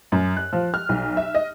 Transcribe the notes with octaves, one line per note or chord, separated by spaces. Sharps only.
F#2
F#6
F3
F6
B1
E5
D#5